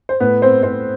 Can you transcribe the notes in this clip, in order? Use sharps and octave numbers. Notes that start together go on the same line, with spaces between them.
C5
A2 B3 B4
C4 C5
A2 C4 C5